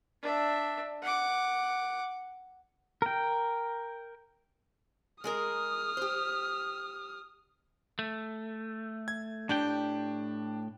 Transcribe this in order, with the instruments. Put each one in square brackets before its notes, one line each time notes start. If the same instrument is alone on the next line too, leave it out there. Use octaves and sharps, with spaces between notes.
[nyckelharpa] D4 E5
F#5 D6
[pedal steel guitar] A#4 G5
[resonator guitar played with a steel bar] G#3 G#4 A#4 [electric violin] D#6 F6
[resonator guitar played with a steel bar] G4 C5
[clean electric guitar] A3
[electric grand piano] G#6
[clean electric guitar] A2 G4 G5 [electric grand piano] D4